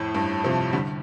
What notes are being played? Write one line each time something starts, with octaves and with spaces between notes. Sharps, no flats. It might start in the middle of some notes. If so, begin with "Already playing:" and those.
Already playing: F2 A2
G2
C3 F3
D3 G3